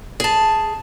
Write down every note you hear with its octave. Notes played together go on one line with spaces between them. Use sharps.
G#4 A5